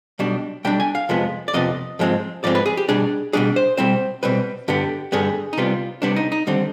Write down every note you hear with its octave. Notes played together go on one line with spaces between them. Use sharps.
B1 B2 G3 D4
B1 B2 G3 D4 G5
G#5
F5
F2 C3 F3 G#3 B3
D5
F2 C3 F3 B3 D#5
G#2 F3 G#3 C4
G#2 F3 G#3 C4 D5
B4
G#4
G4
B2 G3 D4 G#4
B2 G3 D4 G#4
C5
B2 G3 C4 C5
B2 G3 C4 B4
G2 D3 G3 B3 G4
G2 D3 G3 B3 G#4
D#4
C2 C3 G3 B3 F4
C2 C3 G3 B3 D4
D#4
D#4
D#2 D3 G3 C4